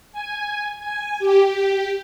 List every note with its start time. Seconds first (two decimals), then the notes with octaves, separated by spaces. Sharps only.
0.12 G#5
0.80 G#5
1.19 G4